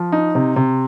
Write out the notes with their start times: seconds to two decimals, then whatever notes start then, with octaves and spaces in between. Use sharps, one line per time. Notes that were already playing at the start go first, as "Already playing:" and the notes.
Already playing: F3
0.12 D#4
0.35 C3
0.56 C3